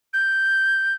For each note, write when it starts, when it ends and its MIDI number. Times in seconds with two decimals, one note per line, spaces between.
0.14 0.94 91